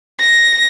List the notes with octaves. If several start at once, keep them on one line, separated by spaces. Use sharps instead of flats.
A#6